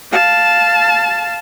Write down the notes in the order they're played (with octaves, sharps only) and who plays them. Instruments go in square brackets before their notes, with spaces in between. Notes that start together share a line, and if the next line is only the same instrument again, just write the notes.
[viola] F5 A5